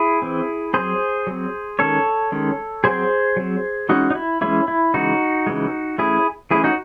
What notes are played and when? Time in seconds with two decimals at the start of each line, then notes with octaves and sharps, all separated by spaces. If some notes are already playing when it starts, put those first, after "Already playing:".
Already playing: E4 G#4
0.22 E3 C4
0.73 F#3 C4 G#4 C5
1.27 F#3 C4
1.79 D#3 G#3 C#4 A4 C#5
2.32 D#3 G#3 C#4
2.84 F#3 C4 G#4 C5
3.37 F#3 C4
3.89 E3 G#3 C#4 D#4 F#4
4.10 D#4
4.15 E4
4.41 E3 G#3 C#4 E4
4.68 E4
4.94 C#3 E3 G#3 D#4 F#4
5.47 C#3 E3 G#3
5.98 E3 A3 C#4 E4 G#4
6.51 E3 A3 C#4 E4 G#4
6.64 D#4 F#4